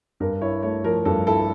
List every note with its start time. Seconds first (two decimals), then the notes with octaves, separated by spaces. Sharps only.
0.20 G2 A#4
0.42 E4 C#5
0.63 A3 C#5
0.84 F3 A#4
1.05 G2 A4
1.27 E4 A4